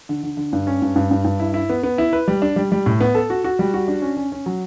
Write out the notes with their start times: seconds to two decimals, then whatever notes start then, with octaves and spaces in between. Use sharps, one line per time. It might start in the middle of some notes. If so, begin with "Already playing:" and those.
0.09 D3
0.23 D3
0.37 D3
0.53 G2
0.67 C#4
0.82 G2
0.96 G2
1.11 G2
1.25 G2
1.40 E4
1.54 E4
1.70 B3
1.83 B3
1.98 E4
2.13 B4
2.28 G3
2.42 D4
2.56 G3
2.72 G3
2.86 A2
3.01 B3
3.15 A4
3.30 F#4
3.44 F#4
3.59 G3
3.74 F#4
3.88 D4
4.02 C#4
4.17 C#4
4.32 C#4
4.46 F#3